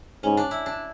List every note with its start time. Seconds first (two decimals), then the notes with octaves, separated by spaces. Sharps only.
0.23 G#2 C#4
0.37 D4
0.51 E4
0.66 D4